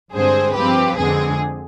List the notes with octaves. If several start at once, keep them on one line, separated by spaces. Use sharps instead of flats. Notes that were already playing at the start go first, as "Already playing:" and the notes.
G2 D3 G#3 C4 G#4 C5
G2 F3 C4 G4 B4
F2 D3 G#3 C4 G#4